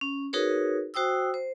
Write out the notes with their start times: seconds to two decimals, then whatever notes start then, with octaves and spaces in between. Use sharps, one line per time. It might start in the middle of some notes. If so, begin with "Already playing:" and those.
0.01 C#4
0.33 D#4 F#4 G#4 A#4 B4 C#5
0.94 F#4 C5 G5 D#6 E6
1.34 C5